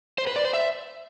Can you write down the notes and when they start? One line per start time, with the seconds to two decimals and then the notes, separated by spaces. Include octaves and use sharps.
0.18 C5
0.27 B4
0.36 D5
0.45 C5
0.53 E5